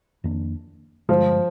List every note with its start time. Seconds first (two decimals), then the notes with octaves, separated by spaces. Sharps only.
0.24 F2 D#3 A#3 D4
1.09 G2 D3 F3 G#3